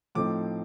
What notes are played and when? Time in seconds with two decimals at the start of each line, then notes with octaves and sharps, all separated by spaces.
0.15 A2 F3 A3 C4 D#4 D6